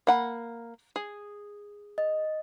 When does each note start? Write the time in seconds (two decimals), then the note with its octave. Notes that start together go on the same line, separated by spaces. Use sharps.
0.07 A#3 F#5 B5
0.96 G#4
1.98 D#5